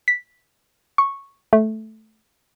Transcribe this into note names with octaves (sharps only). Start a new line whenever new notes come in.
B6
C#6
A3